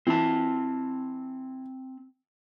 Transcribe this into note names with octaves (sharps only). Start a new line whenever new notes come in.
E3 C4 A5